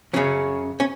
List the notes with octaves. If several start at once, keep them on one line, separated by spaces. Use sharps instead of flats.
F#2 C#3 F#3 C#4
C#4